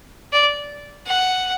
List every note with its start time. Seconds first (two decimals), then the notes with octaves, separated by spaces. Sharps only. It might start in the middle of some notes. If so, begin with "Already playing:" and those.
0.33 D5
1.07 F#5